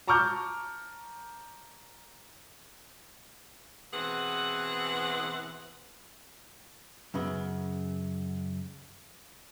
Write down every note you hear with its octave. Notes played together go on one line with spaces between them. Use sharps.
A5 A#5 C#6 D6 F6 G6
B2 E3 C4 G#4 F#5
F#2 C#3 B3